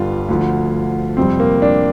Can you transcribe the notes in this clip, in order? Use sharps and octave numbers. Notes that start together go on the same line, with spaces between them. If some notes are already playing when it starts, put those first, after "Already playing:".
Already playing: G1 G2 D3 G3 F4
D2 D3 F3
F2 C3 G3 C4
A#3
D4